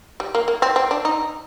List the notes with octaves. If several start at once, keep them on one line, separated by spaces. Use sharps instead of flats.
G3
A#3
A#3
C4
C4
D4
D#4